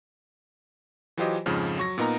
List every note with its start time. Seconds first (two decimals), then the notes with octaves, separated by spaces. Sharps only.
1.17 E3 F#3 F4 G4 C5 D#5
1.46 F2 G#2 C#3 F3
1.78 F#3 C#6 A#6
1.98 A#2 B3 D#4 A#4 A#5